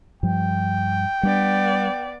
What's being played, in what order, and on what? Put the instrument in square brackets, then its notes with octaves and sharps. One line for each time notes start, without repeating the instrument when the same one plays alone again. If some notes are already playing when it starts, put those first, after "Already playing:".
[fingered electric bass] G2 F3 [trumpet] G5
[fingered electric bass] G3 D4 [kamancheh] B3 D5